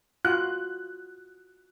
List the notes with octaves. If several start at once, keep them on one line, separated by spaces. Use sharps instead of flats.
F4 F#4 F#6